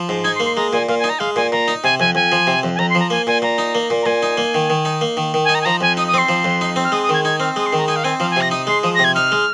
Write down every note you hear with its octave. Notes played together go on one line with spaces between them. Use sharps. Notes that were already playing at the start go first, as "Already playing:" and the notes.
Already playing: F3
G#2
D#4 G#6
C6
A#3
C6
G#3 A#5
A#2 G#5
A#2 F5
G#5
D#4
A#5
G#3 F5
A#2 G#5
A#2 A#5
D#4
C3 G#5
F2 G#5
F2 G#5
F3
C3
F2
G#5
F2 A#5
C6
F3 A#5
A#3 G#5
A#2 G#5
A#2 A#5
D#4
A#3
A#2
A#5
A#2 G#5
D#4
A#3
D#3
D#3
D#4
A#3
D#3
D#3
G#5
D#4
A#5
G#5
F3 A#5
F2 G#5
D#4 D#6
D#6
C4 C6
F3
F2
D#4
C4
F6
G#3 D#6
D#6
D#3 G#6
D#4 G#6
C4 F6
G#3 D#6
C6
D#3
A#5
D#4 G#5
F5
C4 G#5
F3 F5
G#5
C3 A#6
D#4 D#6
G#3 C6
F3 D#6
A#6
C3
G#6
D#4 F6
G#3